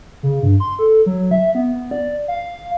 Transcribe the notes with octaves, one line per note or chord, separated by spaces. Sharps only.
C#3
G2
C6
A4
F#3
E5
B3
D5
F5